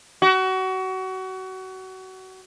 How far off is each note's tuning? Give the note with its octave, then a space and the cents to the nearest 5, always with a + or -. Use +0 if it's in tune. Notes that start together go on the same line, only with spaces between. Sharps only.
F#4 +25